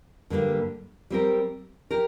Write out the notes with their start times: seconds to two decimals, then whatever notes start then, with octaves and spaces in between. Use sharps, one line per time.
0.30 G2 D3 G3 A#3
1.10 G3 C4 G4 A#4
1.91 G4 A#4